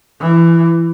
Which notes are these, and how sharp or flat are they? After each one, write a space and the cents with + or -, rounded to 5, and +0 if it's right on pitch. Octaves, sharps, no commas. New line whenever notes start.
E3 +20